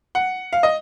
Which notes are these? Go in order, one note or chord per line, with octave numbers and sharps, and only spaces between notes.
F#5
F5
D#5